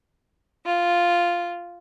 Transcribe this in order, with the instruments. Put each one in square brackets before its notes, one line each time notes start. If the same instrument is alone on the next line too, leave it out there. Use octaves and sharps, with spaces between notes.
[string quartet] F4